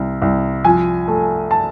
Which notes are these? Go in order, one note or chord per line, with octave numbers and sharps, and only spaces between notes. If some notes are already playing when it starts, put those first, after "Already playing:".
Already playing: C2
C2
F3 G#5
A3
A5